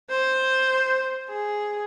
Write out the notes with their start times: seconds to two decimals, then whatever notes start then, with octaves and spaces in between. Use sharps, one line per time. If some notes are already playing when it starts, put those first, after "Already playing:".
0.10 C5
1.29 G#4